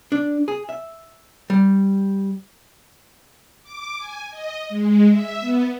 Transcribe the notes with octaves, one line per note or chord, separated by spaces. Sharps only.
D4
G#4
E5
G3
D6
G#5
D#5
G#3
E5
B3